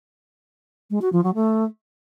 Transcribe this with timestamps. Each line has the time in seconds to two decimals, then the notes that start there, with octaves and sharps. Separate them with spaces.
0.90 G#3
1.02 F#4
1.13 F3
1.24 F#3
1.35 A3